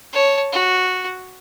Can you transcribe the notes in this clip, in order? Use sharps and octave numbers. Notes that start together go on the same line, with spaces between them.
C#5 A5
F#4